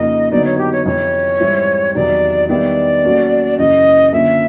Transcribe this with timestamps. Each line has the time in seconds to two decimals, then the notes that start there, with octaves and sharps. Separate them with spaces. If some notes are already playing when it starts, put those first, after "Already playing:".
Already playing: F2 C#3 F3 A#3 D#4 D#5
0.31 D3 F#3 B3 D#4 D5
0.45 C#5
0.58 G4
0.72 C#5
0.86 F2 C3 E3 C#5
1.40 G#2 E3 G3 C4 E4
1.95 E2 C3 D#3 F#3 D5
2.49 D#3 G3 B3 E4 G4 D5
3.04 F#3 A#3 C#4 F#4 A4
3.58 F#2 C#3 E3 D#5
4.12 D3 F3 A#3 C#4 E5